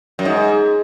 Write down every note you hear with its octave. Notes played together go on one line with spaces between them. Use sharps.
F#2
G#2